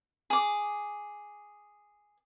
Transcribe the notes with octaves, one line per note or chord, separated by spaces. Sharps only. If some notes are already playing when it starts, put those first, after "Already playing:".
G#4 D6